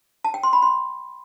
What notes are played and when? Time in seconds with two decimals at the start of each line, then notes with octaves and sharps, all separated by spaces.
0.25 A5
0.34 G5
0.43 C6
0.53 B5
0.62 C6